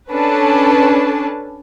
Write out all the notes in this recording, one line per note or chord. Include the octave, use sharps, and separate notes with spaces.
C#4 D4 A4 B4 A5